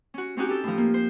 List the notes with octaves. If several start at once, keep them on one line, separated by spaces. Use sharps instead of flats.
C#4 F#4
C4 C#4 D#4 F#4 G4
G4 A4
A2 F3
A#3
C5